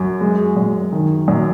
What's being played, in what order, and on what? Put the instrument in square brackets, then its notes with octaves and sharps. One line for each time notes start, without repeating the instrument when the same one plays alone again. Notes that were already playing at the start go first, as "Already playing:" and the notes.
Already playing: [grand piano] F#2
G#3
F#2
D#3
F#2